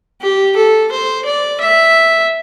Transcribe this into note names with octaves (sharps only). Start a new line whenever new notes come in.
G4
A4
C5
D5
E5